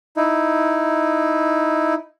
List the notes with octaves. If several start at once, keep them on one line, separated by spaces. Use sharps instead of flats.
D#4 E4